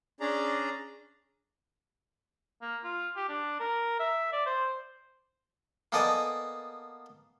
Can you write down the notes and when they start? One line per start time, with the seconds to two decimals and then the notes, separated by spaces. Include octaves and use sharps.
0.20 C#4 D4 G#4 D5 A#5
2.62 A#3
2.84 F4
3.16 G4
3.29 D4
3.60 A#4
3.99 E5
4.33 D5
4.46 C5
5.92 A#3 B3 A4 D5 D#5 G#5